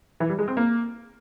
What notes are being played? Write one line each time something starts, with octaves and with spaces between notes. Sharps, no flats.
E3
G3
G#3
C4
A#3